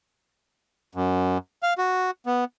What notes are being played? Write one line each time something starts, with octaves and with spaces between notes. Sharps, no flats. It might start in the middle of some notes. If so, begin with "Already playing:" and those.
F#2
F5
F#4
B3